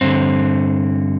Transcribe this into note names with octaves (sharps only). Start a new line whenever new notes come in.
G2 D3 C4